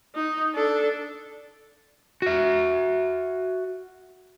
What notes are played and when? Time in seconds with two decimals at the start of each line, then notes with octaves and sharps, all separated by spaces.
0.15 D#4
0.55 D4 A4
2.22 F#4 E5